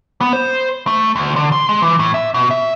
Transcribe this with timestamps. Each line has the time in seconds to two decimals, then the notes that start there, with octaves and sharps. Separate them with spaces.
0.21 B3
0.33 C5
0.87 A3
1.16 D2
1.36 D3
1.52 C6
1.69 G#3
1.82 E3
1.99 A2
2.14 E5
2.34 B2
2.51 E5